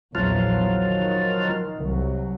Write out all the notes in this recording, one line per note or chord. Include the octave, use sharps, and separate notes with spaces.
A#1 E2 F3 F#3 F4
D#3
C2 F#3